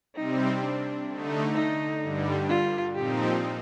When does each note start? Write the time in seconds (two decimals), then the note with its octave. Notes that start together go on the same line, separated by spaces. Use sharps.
0.15 C3 G3 C4 D#4
0.62 D4
1.09 D3 A3 D#4
1.55 D#4
2.02 G2 D3 G3
2.49 F4
2.94 A#2 F3 C4 D#4 G4